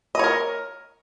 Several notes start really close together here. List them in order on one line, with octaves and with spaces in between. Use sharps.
D#5 C#5 A#4